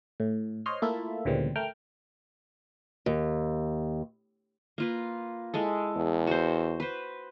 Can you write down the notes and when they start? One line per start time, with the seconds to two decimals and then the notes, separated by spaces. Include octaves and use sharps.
0.20 A2
0.66 C5 C#5 D#5 C6 F6
0.82 A3 A#3 E4 F4 A4 E5
1.25 D2 A#2 C#3 E3 G3 C4
1.56 A3 A#4 G5 F6
3.06 D#2
4.78 A#3 F4 B4
5.54 G#3 E4 A4
5.96 E2
6.27 F#4 C5
6.80 B4 C5